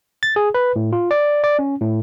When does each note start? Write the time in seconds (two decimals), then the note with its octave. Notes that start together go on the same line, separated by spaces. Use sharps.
0.23 A6
0.36 G#4
0.54 B4
0.76 A2
0.93 F4
1.11 D5
1.44 D5
1.59 C#4
1.81 A2